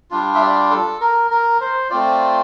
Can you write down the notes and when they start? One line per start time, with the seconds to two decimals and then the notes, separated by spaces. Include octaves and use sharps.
0.11 G3 D4 F4
0.35 E5
0.41 D5
0.71 A4
1.01 A#4
1.31 A#4
1.61 C5
1.90 A3 C4 F4 D5